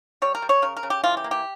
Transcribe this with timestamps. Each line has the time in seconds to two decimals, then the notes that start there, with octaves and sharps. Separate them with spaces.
0.22 G3 C#5
0.35 A#4
0.42 G3
0.49 C#5
0.62 C#3 A#4
0.77 A#4
0.83 C#3
0.90 G4
1.03 E3 F4
1.17 G4
1.24 A#3
1.31 G4